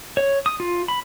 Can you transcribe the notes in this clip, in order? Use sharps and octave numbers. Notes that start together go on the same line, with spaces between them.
C#5
D#6
F4
B5